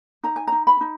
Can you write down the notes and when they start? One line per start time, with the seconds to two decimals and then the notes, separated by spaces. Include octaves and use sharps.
0.24 D#4 A#5
0.36 G#5
0.47 D#4 A#5
0.67 B5
0.81 D#4